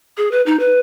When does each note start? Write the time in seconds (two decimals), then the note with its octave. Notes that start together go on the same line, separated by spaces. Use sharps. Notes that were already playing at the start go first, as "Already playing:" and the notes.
0.17 G#4
0.31 B4
0.46 D#4
0.59 B4